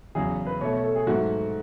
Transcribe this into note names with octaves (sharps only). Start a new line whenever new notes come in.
E2 C#3 F#3 G#4
B4
B2 A3 C#5
C#5
A4
G#4
G#2 F#3 A3 F#4